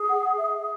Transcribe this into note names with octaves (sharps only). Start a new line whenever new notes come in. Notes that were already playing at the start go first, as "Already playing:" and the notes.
Already playing: G#4
F#5
E5